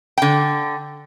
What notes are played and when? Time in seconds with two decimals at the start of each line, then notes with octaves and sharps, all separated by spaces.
0.18 D3 G5